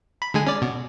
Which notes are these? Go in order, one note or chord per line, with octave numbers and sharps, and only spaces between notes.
B5
D3 G#3 G#5
C#4 D5
B2